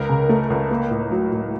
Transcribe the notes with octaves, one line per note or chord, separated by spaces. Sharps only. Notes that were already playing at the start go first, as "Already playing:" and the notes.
Already playing: C#2 A#4
C#3
A3
C#2
A#3
A2
F#3
A2